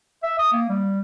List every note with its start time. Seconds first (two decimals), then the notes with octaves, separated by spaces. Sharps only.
0.23 E5
0.39 D#6
0.52 A#3
0.69 G3